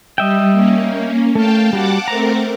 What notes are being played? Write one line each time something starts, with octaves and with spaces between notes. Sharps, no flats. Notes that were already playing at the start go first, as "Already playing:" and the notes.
G3 D#5 E5 G5
A#3 C#4
A3 F5 G5 A5
G3 F#4 F#5 A5 D6
A3 C4 A#4 A#5